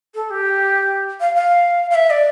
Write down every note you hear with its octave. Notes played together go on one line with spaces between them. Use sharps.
A4
G4
F5
F5
F5
E5
D5